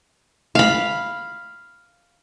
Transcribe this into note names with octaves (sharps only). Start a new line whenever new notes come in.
F5 B5